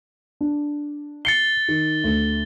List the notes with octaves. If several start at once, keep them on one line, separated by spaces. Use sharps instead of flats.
D4
A6 C7 C#7 G7
D#3
D2